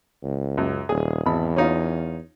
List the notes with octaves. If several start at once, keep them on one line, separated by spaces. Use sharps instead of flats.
C#2
F#2
D#1 G#4
G#1 E2 B5
C#4 D#4 F4